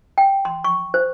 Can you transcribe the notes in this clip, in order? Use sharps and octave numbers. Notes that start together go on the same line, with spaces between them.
G5
C6
C#6
C5